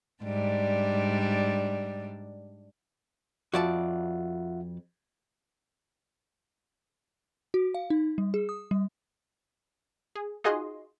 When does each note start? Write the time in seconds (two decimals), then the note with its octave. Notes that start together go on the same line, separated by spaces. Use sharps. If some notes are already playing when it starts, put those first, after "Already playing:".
0.24 G#2 G3 D4
3.54 F2 F4 F#4 D5 E5 F#5 A5
7.54 F#4
7.74 F5
7.90 D#4
8.18 G3
8.34 G#4
8.49 D#6
8.71 G3
10.15 G#4
10.44 D#4 F4 F#4 G#4 D#5 C6